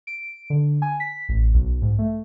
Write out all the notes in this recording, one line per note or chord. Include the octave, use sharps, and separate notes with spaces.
D7
D3
G#5
B6
A1
B1
G#2
A3